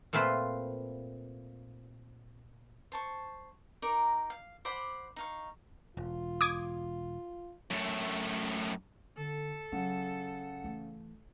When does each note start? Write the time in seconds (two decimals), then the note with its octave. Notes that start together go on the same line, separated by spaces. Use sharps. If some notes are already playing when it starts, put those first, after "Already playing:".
0.13 A#2 A3 C4 F4 B4 C5
2.92 C5 A5 C#6
3.82 D#4 A#4 D5 A#5
4.30 F5
4.65 C5 D5 F#5 B5
5.16 D#4 F5 C#6
5.97 E1 F4
6.41 D6 D#6 G#6
7.71 F#2 A2
9.17 D3 A4
9.72 C#3 F#3 F#5
10.64 E3 A3